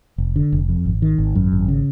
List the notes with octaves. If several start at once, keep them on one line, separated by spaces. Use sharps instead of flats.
F1
D3
F1
F2
G#1
D#3
G#1
F#2
G#1
C#3